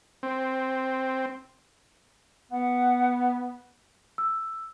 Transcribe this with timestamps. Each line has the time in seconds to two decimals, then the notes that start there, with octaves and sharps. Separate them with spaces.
0.23 C4
2.52 B3 F#5
4.18 E6